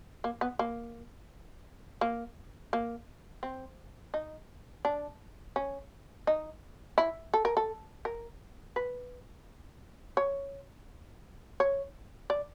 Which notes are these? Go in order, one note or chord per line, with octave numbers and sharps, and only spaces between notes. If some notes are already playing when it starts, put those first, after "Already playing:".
A#3
B3
A#3
A#3
A#3
C4
D#4
D4
C#4
D#4
E4
A4
A#4
A4
A#4
B4
C#5
C#5
D5